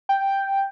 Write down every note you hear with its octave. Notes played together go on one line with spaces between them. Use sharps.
G5